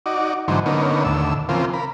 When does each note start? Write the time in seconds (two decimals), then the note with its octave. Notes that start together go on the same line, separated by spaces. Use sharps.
0.06 D#4 F#4 D5
0.48 G#2 D3 E3 F#3 D#4 C5
0.66 D3 A#3 B3 C#4 D#4
1.05 D#2 A2 D3 E6
1.49 C#3 E3 F3 A#3 C4 F4
1.74 A#4 B5